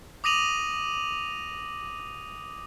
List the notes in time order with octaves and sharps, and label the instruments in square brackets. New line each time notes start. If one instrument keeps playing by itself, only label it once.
[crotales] D6 D#6 A#6 D#7 F7 F#7